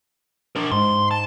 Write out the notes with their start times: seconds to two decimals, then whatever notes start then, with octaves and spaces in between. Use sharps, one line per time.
0.56 D4 A#4
0.72 G#2 C6
1.11 A5